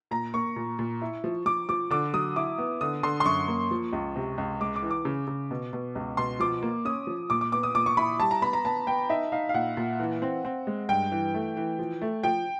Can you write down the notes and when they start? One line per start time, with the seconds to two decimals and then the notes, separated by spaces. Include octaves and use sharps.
0.11 A#2 A#5
0.34 A#3 C#6
0.56 A#2
0.79 A#2
1.02 E4
1.24 F3
1.46 F3 D6
1.69 F3 D6
1.90 D3 D6
2.13 F#3 D#6
2.36 E4 D6
2.58 B3
2.81 D3 D#6
3.03 D3 C6
3.20 C6
3.25 F#2 C#6
3.48 A#3
3.71 F3
3.93 C#2
4.16 C3
4.38 C#2
4.60 G#3 D6
4.76 D6
4.83 E3
4.90 D6
5.05 C#3
5.27 C#3
5.51 B2
5.73 B2
5.95 C#2
6.17 B2 C6
6.40 F3 D6
6.63 A#3
6.85 C#4 D#6
7.07 F3
7.30 A#2 D6
7.41 D6
7.52 B3 D6
7.63 D#6
7.75 A#2 D6
7.86 C#6
7.97 E4 B5
8.20 G3 A5
8.31 A#5
8.42 B3 B5
8.53 A#5
8.65 B3 A5
8.87 B3 G5
9.09 D#4 E5
9.32 D#4 F5
9.49 F5
9.54 A#2 F#5
9.77 A#2
10.00 E3
10.22 C4
10.45 C4
10.67 G#3
10.89 G2 G5
11.12 E3
11.34 A3
11.57 E3
11.79 F3
12.02 A3
12.23 F3 G5